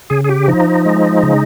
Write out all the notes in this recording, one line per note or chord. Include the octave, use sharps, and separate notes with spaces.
C#3 G#4
G#4
G4
F3 D#4
G#3
C#3